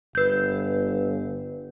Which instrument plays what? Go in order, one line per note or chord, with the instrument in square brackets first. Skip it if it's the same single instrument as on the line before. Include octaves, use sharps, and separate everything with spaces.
[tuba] G1 [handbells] B4 G6